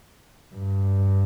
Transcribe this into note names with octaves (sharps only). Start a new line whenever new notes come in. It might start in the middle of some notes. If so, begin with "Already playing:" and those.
G2